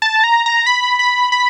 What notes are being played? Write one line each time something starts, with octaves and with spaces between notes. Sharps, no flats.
A5
A#5
A#5
B5
B5
B5